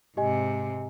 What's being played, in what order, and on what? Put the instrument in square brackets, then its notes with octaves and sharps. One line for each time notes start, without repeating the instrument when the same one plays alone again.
[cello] G#2 C3 [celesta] G4 D#5 G#5